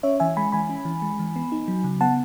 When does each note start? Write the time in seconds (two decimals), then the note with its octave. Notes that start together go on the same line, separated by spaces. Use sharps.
0.03 C#4 C#5 E5
0.20 E3 E5 G#5
0.37 G#3 G#5 B5
0.52 E3 G#5 B5
0.69 C#4
0.85 E3
1.02 G#3
1.19 E3
1.36 B3
1.52 D#4
1.68 F#3
1.84 C#3
2.01 B3 F#5 A5